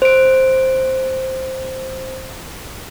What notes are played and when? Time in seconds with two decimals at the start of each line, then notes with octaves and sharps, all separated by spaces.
0.02 C5 D7